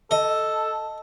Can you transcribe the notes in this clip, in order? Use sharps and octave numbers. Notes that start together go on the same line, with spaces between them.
A4 D#5